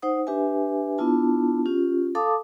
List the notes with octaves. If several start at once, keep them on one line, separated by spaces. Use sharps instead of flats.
D#4 C5 F#5 D#6
D4 G4 B4 E5 G#5
B3 D4 E4 F4 A5
C#4 F4 G4
A4 F5 A5 D6 D#6